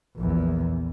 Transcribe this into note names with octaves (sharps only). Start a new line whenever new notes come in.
A#1 E2